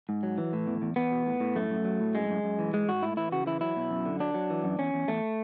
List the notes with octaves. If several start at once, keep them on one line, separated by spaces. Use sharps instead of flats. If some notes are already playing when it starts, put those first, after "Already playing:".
G#2
F#3
E3
A2
E2
E2
E2 B3
B2
A2
A2
F#2 A3
F#2
F#3
A2
F#2 G#3
F#2
F#2
E3
G#2 G#3
G#2 F#4
A2 E4
E3 E4
C#3 F#4
E3 E4
F#3 E4
B2
F#2
D3
F#3 D4
F#3
E3
F#2
E2 C#4
E2
E2 A3